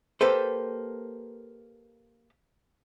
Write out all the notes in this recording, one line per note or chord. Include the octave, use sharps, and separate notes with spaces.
A#3 G4 A4 B4 C5